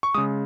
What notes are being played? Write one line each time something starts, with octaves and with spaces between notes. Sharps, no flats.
C#6
C#3 G#3 D#6